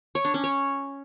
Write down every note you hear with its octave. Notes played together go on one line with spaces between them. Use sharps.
C#5
D4
C#4
C#5